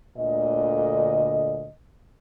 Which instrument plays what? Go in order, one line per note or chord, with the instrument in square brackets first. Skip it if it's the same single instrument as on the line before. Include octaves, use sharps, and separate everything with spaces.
[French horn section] D2 A#2 D3 D#5